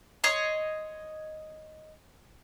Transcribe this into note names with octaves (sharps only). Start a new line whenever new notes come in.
C#5 D#5 C6